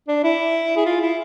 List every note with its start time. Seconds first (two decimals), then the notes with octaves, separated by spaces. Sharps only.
0.08 D4
0.24 E4
0.77 G#4
0.86 F4
1.01 E4